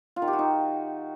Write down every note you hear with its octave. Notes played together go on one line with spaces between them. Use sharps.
F4
D#3
G4
F#4
D#4